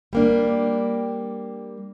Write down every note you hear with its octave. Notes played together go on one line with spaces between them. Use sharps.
G3 A#3 D4